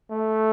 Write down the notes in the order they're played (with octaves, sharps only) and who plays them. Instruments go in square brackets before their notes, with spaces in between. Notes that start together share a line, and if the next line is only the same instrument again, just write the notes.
[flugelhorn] A3